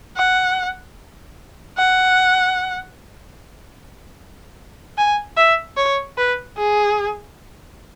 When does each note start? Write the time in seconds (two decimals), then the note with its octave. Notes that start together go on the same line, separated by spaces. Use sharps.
0.16 F#5
1.78 F#5
4.98 G#5
5.37 E5
5.77 C#5
6.18 B4
6.57 G#4